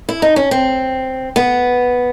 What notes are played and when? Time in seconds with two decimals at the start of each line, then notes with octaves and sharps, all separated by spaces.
0.09 E4
0.22 D#4
0.36 C#4
0.51 C4
1.36 B3